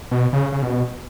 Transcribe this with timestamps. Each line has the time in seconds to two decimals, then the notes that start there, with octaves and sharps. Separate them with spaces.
0.11 B2
0.33 C#3
0.52 C#3
0.62 B2